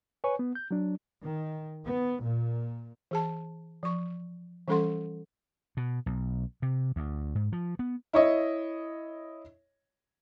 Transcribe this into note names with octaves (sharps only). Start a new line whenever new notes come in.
B4 C#5 G#5 C#6
B3
G6
F#3 D4
D#3
B3
A#2
E3 G#4 A5
F3 C#6
E3 G3 C#4 A4 F#5 C6
B2
B1
C3
D2
G#2
F3
B3
E4 C#5 D#5